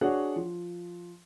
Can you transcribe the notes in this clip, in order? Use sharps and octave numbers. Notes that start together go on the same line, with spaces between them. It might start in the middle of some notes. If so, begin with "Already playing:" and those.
D4 F#4 G#4 C#5 F#5
F3